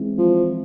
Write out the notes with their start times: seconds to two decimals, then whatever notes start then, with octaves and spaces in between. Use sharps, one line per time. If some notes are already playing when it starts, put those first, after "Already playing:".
Already playing: E3 G#3 C4
0.18 F3